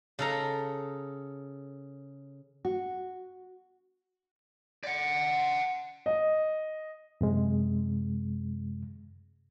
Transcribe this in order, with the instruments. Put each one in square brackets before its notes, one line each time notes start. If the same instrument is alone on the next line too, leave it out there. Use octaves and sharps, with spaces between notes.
[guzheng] C#3 A4 A#5
[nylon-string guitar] F#4
[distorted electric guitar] D5 F#5
[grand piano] D#5
[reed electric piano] F#2 C3 G#3